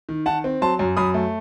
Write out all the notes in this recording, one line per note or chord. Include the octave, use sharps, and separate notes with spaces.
D#3
D#3 F#5 A5
C4
F#3 A5 C6
F#2
F#2 B5 D#6
A3